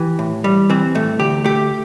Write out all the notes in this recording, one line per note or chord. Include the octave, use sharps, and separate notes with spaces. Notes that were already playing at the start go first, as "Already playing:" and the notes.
Already playing: E3 G4
A2
G3
E3 C4
A2 A3
D2 G4
A3 G4